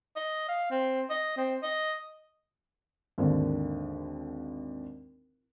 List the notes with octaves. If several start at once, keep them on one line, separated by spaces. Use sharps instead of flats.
D#5
F5
C4
D#5
C4
D#5
G#1 D#2 D3